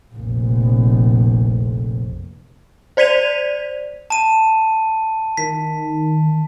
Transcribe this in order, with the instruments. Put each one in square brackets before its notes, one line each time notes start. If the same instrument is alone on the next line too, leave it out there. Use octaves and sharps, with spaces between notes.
[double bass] F1 A#1
[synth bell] C5 D5 G#6 B6 D#7 F7
[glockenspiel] A5 D#7
[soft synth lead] D#3 [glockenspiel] B6